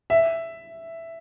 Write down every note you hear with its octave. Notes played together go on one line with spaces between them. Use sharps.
E5